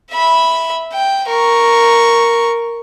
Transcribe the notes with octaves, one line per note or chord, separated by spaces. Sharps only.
E5 B5
G5
A#4 C#6